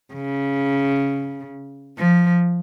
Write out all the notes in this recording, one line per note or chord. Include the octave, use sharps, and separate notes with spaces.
C#3
F3